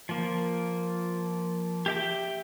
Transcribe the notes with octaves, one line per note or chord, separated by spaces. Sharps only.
F3 A#3
G4 E5 G5